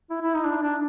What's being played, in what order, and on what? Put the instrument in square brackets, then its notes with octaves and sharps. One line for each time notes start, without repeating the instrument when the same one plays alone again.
[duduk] E4
E4
D#4
D4
D4